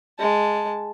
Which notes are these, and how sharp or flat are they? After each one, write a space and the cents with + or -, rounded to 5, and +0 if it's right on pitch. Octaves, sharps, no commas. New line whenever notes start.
G#3 +0 A5 +0